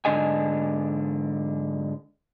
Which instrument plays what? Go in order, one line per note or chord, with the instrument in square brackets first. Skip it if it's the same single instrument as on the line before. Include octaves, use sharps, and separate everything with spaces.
[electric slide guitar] G#2 D3 D4 D#5 G#5